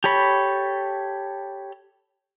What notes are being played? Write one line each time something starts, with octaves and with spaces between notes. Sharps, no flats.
G4 A4 C#5 B5